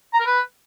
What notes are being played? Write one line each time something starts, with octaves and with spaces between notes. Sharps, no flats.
A#5
A#4
B4